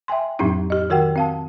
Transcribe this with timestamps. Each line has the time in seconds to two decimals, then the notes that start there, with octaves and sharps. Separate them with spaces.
0.08 E5 G5 G#5 C6
0.39 F2 A2 F#3 C4 D4 D#4
0.70 G4 D#5
0.90 D#3 F#4 A#4 F#5 G5
1.16 C4 F5 A5